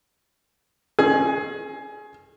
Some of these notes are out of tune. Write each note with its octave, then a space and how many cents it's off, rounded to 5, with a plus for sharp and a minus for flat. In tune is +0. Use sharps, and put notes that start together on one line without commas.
C#4 -35 G#4 +20